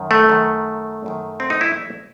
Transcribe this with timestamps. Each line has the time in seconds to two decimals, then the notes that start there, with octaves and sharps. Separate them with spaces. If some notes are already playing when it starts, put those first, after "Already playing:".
Already playing: F#2 D#3
0.11 A3
0.29 F#2 D#3
1.06 F#2 D#3
1.40 C4
1.50 D#4
1.61 E4